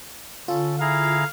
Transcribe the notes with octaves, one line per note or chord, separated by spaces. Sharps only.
D3 C#4 F4 A4
E4 G#4 F5 A#5